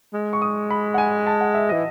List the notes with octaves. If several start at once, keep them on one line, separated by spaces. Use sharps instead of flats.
G#3
C#6
D#6
B5
F#5
G#5
A5
F#5
E5
E3 D#5